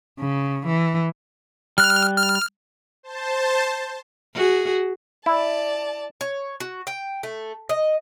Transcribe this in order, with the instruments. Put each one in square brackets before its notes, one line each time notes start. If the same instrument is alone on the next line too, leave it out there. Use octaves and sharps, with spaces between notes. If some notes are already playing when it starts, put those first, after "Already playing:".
[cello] C#3
E3
[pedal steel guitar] G3 F#6 [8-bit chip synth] F6
[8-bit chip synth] F6
[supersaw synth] C5 A5
[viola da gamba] F#4 G#4
[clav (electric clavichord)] E4 [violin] D5 A5
[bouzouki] C#5
F#4
G5
A3
D#5